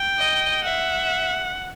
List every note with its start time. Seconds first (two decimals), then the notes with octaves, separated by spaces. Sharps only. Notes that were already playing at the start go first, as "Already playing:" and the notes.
Already playing: G5
0.19 D#5
0.63 E5 F#5